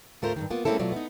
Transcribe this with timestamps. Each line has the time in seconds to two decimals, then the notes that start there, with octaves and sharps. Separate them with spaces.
0.22 D2 G#2 A3 F4 A#4 C5
0.36 G2 A#2 D#3
0.50 A#3 B3 F4
0.65 G#3 A#3 C4 C#4 E4 A4
0.79 B2 F#3 A3 F4 D5
0.92 B3 D#4